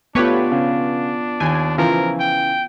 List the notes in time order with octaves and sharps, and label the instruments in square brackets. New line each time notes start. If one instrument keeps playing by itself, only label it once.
[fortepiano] A3 [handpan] B3 F4 [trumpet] D4 [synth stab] G4 B4 C#5
[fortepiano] C#3
[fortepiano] D#2 [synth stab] G#5
[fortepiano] C#3 E3 [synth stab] F3 [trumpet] A#4
[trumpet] G5